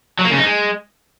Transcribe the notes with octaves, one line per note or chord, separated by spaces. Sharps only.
F#3
A#3
C#3
D#4
G#3